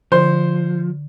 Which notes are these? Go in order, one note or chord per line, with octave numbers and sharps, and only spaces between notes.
D3 F3 C5